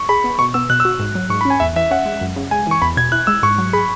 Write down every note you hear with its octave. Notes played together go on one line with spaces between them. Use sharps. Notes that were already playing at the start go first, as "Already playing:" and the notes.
Already playing: C#6
G#4 B5
B3
B2 C#6
B3 E6
B2 F#6
E6
F#4
G#2
F#3
G#2 C#6
B5
C#4
G#5
E2 E5
E3 E5
C#4 F#5
G#3
F#2
C#3
G#3 G#5
E3 C#6
E2 B5
B2 G#6
E4 F#6
G#3 E6
G#2 C#6
F#3
G#4 B5